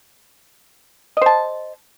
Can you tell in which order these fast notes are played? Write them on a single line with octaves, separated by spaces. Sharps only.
D#5 C5 A5